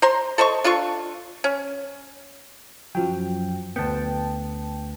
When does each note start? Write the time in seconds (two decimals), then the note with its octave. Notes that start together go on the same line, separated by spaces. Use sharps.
0.02 C5 A#5 C6
0.38 A4 C5 D#5 C#6
0.64 D4 F4 A4 C#6
1.44 C#4
2.95 F#2 F3 F#3 G5
3.76 D2 B3 G5 A5